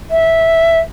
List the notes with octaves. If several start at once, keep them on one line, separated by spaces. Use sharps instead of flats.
E5